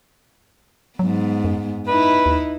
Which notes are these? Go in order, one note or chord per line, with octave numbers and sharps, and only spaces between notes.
G#2 F#3 B3
F#2
D#4 E4 B4
D#2